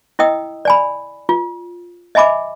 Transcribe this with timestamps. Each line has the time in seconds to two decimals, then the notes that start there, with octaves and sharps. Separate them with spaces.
0.19 E4 D#5 G5 D#6 E6
0.65 D5 G#5 B5
1.29 F4
2.15 D#5 E5 G#5 B5 D6